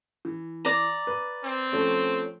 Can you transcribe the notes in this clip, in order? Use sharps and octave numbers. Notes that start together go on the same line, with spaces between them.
E3
D5 A#5
B4
C4
F3 A3 C#4